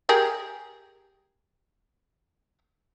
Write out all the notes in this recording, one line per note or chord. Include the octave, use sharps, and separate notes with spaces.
G4 G#4 A#4